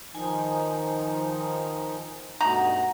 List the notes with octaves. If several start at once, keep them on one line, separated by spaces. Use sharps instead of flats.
D#3 F3 D#4 G#5
G2 B2 A3 D#4 F#5 A#5